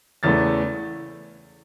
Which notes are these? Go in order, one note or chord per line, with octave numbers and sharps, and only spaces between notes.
E2 C#3 E3 A3 A6